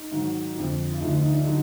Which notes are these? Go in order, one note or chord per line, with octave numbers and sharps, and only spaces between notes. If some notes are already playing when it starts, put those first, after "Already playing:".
Already playing: D#4
G#2 D#3 F#3
F2 D3 F3
F4
D2 D3 F3 D#4
F4
D#4
D4
D3 F#3 D#4